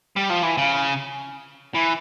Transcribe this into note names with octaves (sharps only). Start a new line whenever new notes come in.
G3
F3
E3
C#3
E3